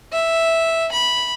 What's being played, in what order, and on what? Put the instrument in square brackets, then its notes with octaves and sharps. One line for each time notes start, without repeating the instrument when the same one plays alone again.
[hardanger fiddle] E5
B5